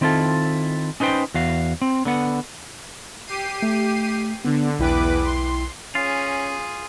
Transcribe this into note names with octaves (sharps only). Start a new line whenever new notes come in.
D#3 C4 E4 F4 A4
C#4 D#4 B4 C5 G5
E2 F#4 F5
C4
D3 B3 F#5
G4 C7 D#7
A3
D3 B3 D4
B1 E2 E4 B4 G5 D6
C6
C#4 F4 G#4